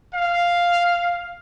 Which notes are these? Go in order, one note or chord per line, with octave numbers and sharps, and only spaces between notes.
F5